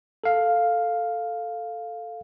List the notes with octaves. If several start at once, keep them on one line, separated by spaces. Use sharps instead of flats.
A4 F5